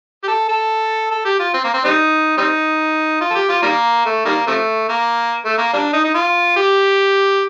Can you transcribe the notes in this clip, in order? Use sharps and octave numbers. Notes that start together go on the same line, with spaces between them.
G4
A4
A4
A4
G4
F4
C4
A#3
C4
G3 C4 D#4
G3 C4 D#4
F4
A4
G4
F4
D#3 G3 A#3
A3
D#3 G3 A#3
C3 F3 A3
A#3
A3
A#3
G3 A#3 D4
D#4
D#4
F4
G4